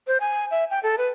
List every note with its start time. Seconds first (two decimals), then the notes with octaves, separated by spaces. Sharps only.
0.07 C5
0.20 G#5
0.51 E5
0.70 G5
0.83 A4
0.98 B4